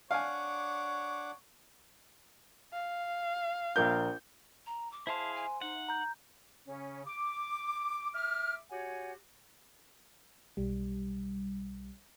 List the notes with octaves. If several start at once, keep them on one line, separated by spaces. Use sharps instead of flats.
D4 C#5 F5 F#5 G#5 D6
F5
A#1 A#4 G6
A#5
D6
E4 G#4 C5 E5 F5 A5 C6
G#5
D#4 F#5
A#5 G6
C#3 C#4
D6
E5 D6 F6
F#4 G4 C#5 F#5 G#5
B1 G3